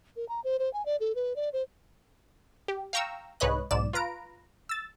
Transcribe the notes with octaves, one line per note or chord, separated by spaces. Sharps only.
A#4
A#5
C5
C5
G#5
D5
A4
B4
D5
C5
G4
F5 G5 A#5 C#6 E6
C2 G#2 B4 C#5 D#5 F#6
B1 G#2 D5 E7
F4 B4 A#5 D7
E6 A6